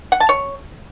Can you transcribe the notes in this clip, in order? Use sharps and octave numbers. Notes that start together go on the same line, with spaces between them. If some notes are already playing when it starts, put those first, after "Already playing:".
F#5
A5
C#5